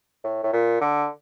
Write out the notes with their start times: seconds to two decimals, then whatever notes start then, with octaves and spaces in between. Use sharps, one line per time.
0.24 A2
0.43 A2
0.53 A#2
0.81 D3